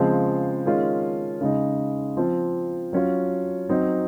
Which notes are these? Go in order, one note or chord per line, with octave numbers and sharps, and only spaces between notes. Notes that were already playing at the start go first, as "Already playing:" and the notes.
Already playing: C#3 F3 G#3 C4
D#3 G#3 C#4 F4
C#3 G#3 D#4
F3 C4 F4
F#3 C#4 F4
F#3 C4 D#4